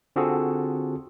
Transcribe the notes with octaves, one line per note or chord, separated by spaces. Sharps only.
D3 C4 F4 F#4 G#4 A4